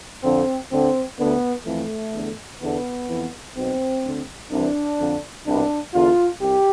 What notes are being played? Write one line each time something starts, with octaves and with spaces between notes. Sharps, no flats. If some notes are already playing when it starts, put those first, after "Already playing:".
F2 D3 C4
D2 D3 C4
D2 D3 B3
F2 E3 A3
E2 D3
E2 D3 B3
F2 E3
B1 B2 C4
D2 D3
C2 C3 E3 D4
F2 D3
C2 B2 D4
E2 D3 F4
C2 G4